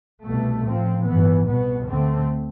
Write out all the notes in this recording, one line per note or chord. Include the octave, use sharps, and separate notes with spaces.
C2 B2 A3
A2 F3 C4
G2 E3 B3
C2 B2 B3
D2 D3 A3 C4